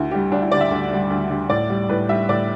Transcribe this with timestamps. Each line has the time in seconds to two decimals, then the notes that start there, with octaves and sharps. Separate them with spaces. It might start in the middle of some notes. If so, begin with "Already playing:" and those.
Already playing: D2 E4
0.11 D3 G3 G4
0.31 D2 D4
0.42 E4
0.51 D3 G3 D5
0.61 E5
0.71 D2
0.90 D3 G3
1.10 D2
1.30 D3 G3
1.50 A2 D5
1.70 G3
1.89 A2 B4
2.09 G3 E5
2.29 A2 D5